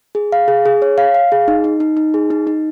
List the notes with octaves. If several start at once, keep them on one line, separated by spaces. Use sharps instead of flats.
G#4
F5
G#4
G#4
C#5
F5
F5
G#4
D#4
D#4
D#4
D#4
G#4
D#4
D#4